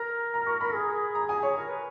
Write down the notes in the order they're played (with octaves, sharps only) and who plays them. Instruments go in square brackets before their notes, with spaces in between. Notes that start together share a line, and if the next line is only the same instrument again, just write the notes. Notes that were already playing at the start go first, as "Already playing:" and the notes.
Already playing: [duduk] A#4 [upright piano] A#5
[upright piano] A#5
C#6
B5
[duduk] G#4
[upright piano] A#5
G#5
C#5
[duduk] A#4
B4